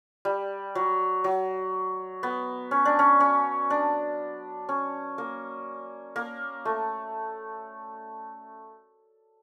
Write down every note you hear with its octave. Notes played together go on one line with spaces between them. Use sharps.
G3
F#3
F#3
B3
C#4
D4
C#4
C#4
D4
C#4
A#3
A#3
A3